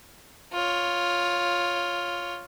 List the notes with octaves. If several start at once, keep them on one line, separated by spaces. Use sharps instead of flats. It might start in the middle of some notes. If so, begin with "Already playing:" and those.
F4 C#5